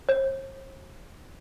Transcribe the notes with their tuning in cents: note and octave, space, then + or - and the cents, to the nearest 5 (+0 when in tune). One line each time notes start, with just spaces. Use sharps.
C5 +45